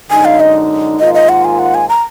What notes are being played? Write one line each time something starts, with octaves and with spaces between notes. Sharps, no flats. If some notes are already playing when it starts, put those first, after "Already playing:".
F#2 D3 G#3 D#4 G#5
F5
D#5
G#2 D#3 A#3 F4 D#5
D#5
F#5
G#5
F#5
G#5
A#5